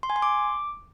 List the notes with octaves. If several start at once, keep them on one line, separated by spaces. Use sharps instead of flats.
C6
G#5
C6
D6